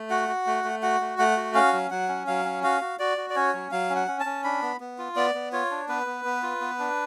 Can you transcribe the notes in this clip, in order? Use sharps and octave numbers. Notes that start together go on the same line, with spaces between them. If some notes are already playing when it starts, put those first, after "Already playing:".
Already playing: A3
F#4 F#5
F#4
A3
A3
F#4 F#5
A3
A3 F#5
F#4
C#4 F5
F#3
F#3 F#5
C#4
F#3 F5
C#4
F#4 F5
F#4
F#4 D5
F#4
D5
C#4 C#5
F#3
F#3 F5
C#4
F#5
C#4
A5
C#4
D4 B5
B3
B3
F4
B3 D5
B3
F4 C#5
D4
B3 B4
B3
B3
F4
B3
D4